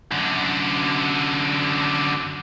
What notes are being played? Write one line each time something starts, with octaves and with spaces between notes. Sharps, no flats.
F#2 D3